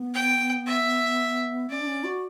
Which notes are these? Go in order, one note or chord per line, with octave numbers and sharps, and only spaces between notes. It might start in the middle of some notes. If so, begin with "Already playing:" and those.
Already playing: B3
G5
E5
C#4 D5
D4
C#4
F#4